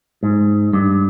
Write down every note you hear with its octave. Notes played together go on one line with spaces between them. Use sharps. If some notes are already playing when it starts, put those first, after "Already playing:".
G#2
G2